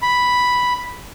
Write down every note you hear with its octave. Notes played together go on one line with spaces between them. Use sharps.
B5